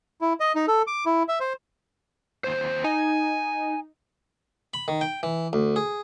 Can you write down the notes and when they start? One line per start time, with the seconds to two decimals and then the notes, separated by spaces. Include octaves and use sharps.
0.21 E4
0.40 D#5
0.55 D#4
0.68 A4
0.87 D6
1.06 E4
1.28 E5
1.40 C5
2.44 D#2 C5
2.84 D#4 G#5
4.74 B5
4.88 D#3
5.01 G5
5.23 E3
5.53 D2
5.76 G#4